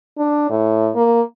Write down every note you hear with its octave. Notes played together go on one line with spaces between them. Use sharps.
D4
A2
A#3